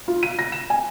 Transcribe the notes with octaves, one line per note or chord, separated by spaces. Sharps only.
F4
D#7
A#6
E7
G#5